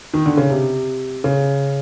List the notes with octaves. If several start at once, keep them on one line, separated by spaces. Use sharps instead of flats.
D#3
D3
C#3
C3
C#3